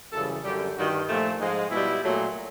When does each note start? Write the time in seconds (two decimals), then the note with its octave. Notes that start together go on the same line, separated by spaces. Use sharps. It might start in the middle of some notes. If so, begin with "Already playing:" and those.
0.12 F#2 C#3 E3 G3 A4
0.44 F#2 D3 G3 G4
0.76 G2 D#3 G3 F#4
1.08 A#2 F3 A3
1.39 G#2 F3 G#3
1.71 B2 G3 E4
2.02 A#2 F#3 A3